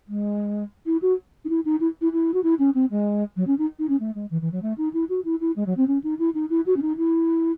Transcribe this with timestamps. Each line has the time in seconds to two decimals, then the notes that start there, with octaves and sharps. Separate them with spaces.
0.08 G#3
0.86 E4
1.02 F#4
1.44 D#4
1.49 E4
1.65 D#4
1.80 E4
2.01 E4
2.12 E4
2.33 F#4
2.43 E4
2.59 C#4
2.74 C4
2.90 G#3
3.36 F#3
3.47 C#4
3.58 D#4
3.79 D#4
3.89 C#4
4.00 A3
4.15 G#3
4.30 E3
4.41 E3
4.52 F#3
4.62 A3
4.77 D#4
4.93 E4
5.09 F#4
5.24 E4
5.40 E4
5.56 G#3
5.66 F#3
5.77 C4
5.87 C#4
6.03 D#4
6.19 E4
6.34 D#4
6.50 E4
6.66 F#4
6.76 C#4
6.82 D#4
6.97 E4